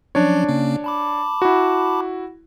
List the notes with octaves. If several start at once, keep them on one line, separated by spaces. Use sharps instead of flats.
F3 F#3 C#4 D4 C#5
C#3 A#3 C#4
A5 B5 D6
E4 F#4